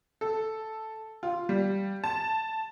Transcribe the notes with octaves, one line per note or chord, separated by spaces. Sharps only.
A4
F4
G3
A5